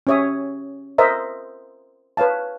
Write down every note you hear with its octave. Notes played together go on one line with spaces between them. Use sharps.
C#4 G4 C#5 E5 D#6
A#4 C5 D#5 E5 A#5
B4 C#5 F5 A5